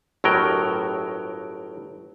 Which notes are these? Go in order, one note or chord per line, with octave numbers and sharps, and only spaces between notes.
G1 A2 F#3 A#4 G5